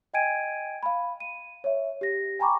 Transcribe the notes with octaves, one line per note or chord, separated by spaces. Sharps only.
D#5 G5 G#5 G#6 D7 D#7
F5 B5
D#7
C#5 E5
G4 A#6
G5 G#5 A#5 B5 C#6 D6